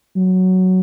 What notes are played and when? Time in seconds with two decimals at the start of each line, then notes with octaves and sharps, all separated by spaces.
0.16 F#3